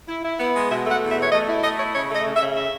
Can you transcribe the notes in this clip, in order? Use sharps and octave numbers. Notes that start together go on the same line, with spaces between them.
E4
E4
B3
G#3
B2 E5
A3
F#5
E2
E5
B2
C#5
A3 D#5
E4
A3 D#5
E4 C#5
C#3 C#5
A3
D#5
C#3
E5
C#3
E5